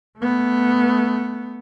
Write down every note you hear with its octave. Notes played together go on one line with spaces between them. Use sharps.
A3 B3